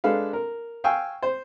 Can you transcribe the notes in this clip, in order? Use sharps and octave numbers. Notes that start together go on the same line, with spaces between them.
G#3 D4 A4 B4 F5
A#4
F5 G5 G#5 C#6 E6
C5